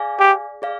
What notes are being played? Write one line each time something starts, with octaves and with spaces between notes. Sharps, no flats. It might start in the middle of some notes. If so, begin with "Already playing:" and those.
Already playing: G#4 D5 F5 G#5
G4
G#4 D5 F5